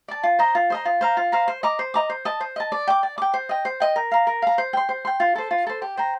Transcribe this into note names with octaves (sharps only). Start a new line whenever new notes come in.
D5 A5
F4
C5 D#5 A#5
F4
C5 D#5 A#5
F4
C5 F5 A#5
F4
C5 F5 A#5
C5
D#5 A#5 D6
C5
D#5 A#5 D6
C5
D#5 A5
C5
D#5 A5
D5
G5 D6
D5
G5 D6
C5
D#5 G5
C5
D#5 G5
A#4
F5 A#5
A#4
F5 A#5
C5
G5 C6
C5
G5 C6
F4
A4 C5
F4
A4 C5
G4
C5 G5 A#5